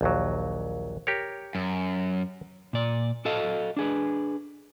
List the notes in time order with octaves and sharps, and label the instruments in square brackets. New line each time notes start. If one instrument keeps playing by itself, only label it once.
[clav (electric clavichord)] A#1 D#2 F#3
G4 A#4 C#5
[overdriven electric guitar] F#2
[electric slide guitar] A#2 D5
F#4 A4 D#5 F5
D4 G#4 B4